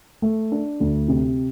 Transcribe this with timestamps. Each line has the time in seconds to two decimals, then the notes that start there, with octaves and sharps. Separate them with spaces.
0.22 A3
0.52 D4
0.80 D2
1.08 C3